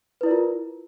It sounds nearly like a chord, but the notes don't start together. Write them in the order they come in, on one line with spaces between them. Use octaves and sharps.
B4 E4 D5 A#4 F4